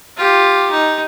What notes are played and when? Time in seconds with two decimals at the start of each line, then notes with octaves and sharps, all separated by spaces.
0.17 F4 G4
0.71 D#4